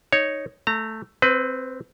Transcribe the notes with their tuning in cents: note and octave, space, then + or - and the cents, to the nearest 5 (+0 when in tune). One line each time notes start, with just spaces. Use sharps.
D#4 +0 C#5 +0
A3 +0 A#5 -25
C4 +0 B4 +25